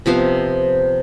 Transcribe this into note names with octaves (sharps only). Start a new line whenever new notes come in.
C3 F3 B3 F5